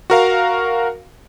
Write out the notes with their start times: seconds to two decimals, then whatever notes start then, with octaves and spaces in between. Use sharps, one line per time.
0.10 F#4 A#4 F5